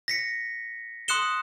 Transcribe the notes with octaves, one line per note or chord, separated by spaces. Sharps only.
A#6 B6 C#7
C6 D#6 F#6 C#7 E7 G7